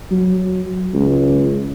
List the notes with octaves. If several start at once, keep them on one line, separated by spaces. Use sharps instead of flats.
F#3
C#2